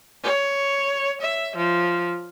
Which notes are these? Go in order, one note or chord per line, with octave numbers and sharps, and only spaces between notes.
C#5
E5
F3